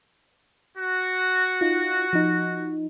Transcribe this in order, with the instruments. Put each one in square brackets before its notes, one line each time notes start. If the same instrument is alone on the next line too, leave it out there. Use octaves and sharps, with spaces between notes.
[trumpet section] F#4
[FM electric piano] D#4 F4
F3 D#4